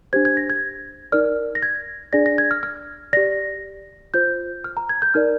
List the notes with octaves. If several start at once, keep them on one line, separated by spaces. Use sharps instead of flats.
D4 G4 C5 G#6
G#6
A#6
G#6
D#4 A#4 D5 F6
A#6
G#6
D4 G#4 D5 A#6
A#6
G#6
F6
F6
G4 D5 A#6
F4 C5 G6
F6
A#5
G#6
G6
D#4 A#4 D5 F6